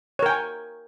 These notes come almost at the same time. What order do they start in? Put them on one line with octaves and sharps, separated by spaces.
C#5 A#4 G5 G#5